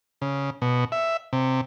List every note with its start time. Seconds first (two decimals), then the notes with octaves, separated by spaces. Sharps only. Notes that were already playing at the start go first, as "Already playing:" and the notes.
0.22 C#3
0.62 B2
0.92 E5
1.33 C3